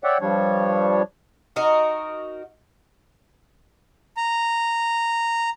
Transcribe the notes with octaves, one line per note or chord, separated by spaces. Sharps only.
C#5 D5 E5 F#5 G5
G2 F3 G3 D4 C#5
D#4 F#4 A#4 D#5
A#5